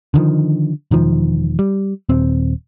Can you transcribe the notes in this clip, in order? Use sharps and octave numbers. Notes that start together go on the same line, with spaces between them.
D3 D#3 F3
E1 D#3 F3
G3
D#1 C4